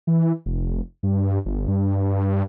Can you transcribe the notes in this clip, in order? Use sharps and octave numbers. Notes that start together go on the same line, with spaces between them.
E3
F1
G2
G1
G2